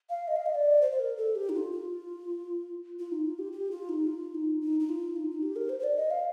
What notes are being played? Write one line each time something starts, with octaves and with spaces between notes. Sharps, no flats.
F5
D#5
F5
D#5
D5
C5
C5
A#4
A4
G4
D#4
F4
F4
F4
D#4
F4
G4
G4
F4
D#4
F4
D#4
D#4
D#4
F4
D#4
D#4
G4
A#4
C5
C5
D5
D#5
F5